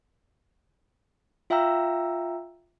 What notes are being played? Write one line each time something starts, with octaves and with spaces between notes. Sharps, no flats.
F4 E5 F5 G5 A#5 E6